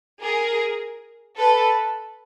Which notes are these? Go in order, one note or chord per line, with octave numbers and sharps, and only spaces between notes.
G#4 A#4
A4 B4